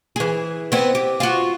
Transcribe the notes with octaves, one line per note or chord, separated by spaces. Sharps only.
E3 G#4
B3 C4
G4
F4 F#4